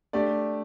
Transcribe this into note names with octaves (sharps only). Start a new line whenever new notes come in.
A3 D4 G4 D5